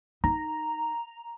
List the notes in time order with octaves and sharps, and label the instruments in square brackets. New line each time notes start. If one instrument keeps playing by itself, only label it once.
[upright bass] D#4 [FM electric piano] A#5